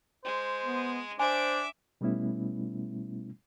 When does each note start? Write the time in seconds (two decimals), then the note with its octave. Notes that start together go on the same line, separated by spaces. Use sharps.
0.25 G#3 C5
0.64 B3
1.20 D4 C5 E5 G#5 D6
2.01 B2 G3 A3 B3 C#4 E4